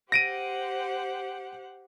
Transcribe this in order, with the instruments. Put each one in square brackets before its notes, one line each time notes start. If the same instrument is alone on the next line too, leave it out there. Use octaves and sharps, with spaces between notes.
[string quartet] G4 C5 F#5 [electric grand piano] A#6 D7 D#7